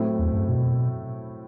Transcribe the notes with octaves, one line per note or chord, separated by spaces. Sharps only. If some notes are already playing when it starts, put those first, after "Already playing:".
Already playing: A2 F#3 A3 C4 E4
E2
F#2
B2